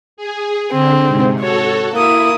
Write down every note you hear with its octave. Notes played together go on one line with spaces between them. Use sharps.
G#4
D3 C4
G#2 C3
F#4 A4 C#5
A#3 E4 D#6